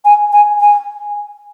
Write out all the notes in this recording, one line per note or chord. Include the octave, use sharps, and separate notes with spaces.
G#5
G#5
G#5